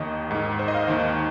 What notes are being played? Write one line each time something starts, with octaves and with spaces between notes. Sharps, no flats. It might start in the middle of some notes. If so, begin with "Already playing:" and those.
Already playing: D#2 D#3 D#5
G#2 D#3
C5
D#5
F5
D#2 D#3